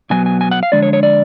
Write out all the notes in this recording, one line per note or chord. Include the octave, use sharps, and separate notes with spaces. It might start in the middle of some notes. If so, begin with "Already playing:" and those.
B2 F#3 B3 G#5
G#5
G#5
F#5
F5
F2 D3 G#3 D4 D5
C#5
C#5
D5